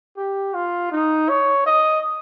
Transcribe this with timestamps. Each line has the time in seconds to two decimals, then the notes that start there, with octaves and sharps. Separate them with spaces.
0.18 G4
0.54 F4
0.92 D#4
1.29 C#5
1.66 D#5